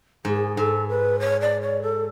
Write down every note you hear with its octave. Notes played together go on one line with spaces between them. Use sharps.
G#2 G#4
G#2 A4
B4
C#5
D5
C#5
A4